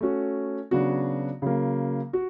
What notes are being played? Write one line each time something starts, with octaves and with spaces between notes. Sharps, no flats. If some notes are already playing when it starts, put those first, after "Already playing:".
A3 C#4 F#4
C#3 F#3 B3 D4 F#4
C#3 F#3 A#3
F#4